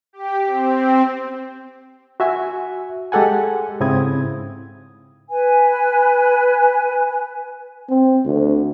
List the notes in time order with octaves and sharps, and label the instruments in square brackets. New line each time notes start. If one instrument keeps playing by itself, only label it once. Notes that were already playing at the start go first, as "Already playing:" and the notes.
[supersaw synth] G4
C4
[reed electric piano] F#4 E5 G#5
G#3 G4 A4 F#5 G#5
G#2 C#3 C4 E4 D#6 G#6
[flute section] B4 G#5
[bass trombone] C4
D2